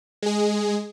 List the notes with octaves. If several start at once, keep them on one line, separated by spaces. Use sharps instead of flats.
G#3 G#4